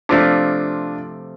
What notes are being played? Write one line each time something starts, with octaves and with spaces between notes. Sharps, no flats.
C3 F3 A3 D4 F4